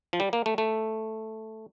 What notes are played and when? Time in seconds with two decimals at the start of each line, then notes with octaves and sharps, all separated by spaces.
0.13 F3
0.20 G3
0.33 A#3
0.46 A3
0.58 A3